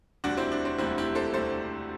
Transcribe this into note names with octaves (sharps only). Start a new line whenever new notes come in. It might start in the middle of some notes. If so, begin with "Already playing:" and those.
E1 D2 C3 G3 D4 F#4
C4 E4
D4
C4
E1 D2 C3 G3 C4 E4
E4 G4
A4 C5
E1 D2 C3 G3 A4 C5